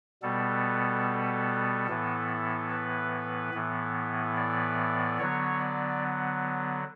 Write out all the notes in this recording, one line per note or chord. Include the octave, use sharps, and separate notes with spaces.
B2 G3 B3 A4
A2 E3 B3
B4
A2 E3 B3
D5
D3 F#3 B3 C#5
D5